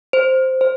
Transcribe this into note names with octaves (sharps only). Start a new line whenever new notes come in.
C5
C5